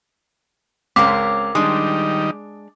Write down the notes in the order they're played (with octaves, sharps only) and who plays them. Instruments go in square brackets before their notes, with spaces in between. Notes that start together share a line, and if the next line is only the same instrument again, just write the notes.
[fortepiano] C#2 [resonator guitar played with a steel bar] C4 C#4 A#4 [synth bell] D6
[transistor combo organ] D#3 G3 D#4 [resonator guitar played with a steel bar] G#3 D4 [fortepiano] D#6